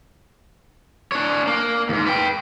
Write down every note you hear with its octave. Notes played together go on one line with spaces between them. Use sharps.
D4 C#5
A#3
D#2 G#2
B4 G5